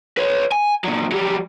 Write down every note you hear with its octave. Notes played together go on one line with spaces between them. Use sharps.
B4 C#5
G#5
A#2 F#3
F#3 G3